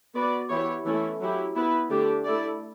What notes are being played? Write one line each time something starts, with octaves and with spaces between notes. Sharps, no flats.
B3 F#4 B4 D5
E3 B3 E4 G4 C#5
E3 A3 C#4 E4 A4
F#3 C#4 E4 G4
B3 E4 B4
D3 A3 D4 G4
A3 E4 A4 D5